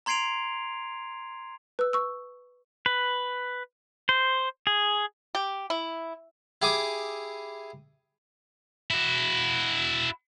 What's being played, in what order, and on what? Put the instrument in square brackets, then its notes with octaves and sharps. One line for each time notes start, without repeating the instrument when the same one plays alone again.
[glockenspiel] A#5 C6 G#6 C7 D7 F7
[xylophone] B4 E6
C#6 E6
[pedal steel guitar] B4
C5
G#4
[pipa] G4
E4
[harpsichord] E4 G4 G#4 G#5 D6 D#6
[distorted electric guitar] E4 F#4